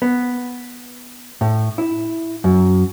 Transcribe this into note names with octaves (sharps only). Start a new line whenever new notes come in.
B3
A2
E4
F#2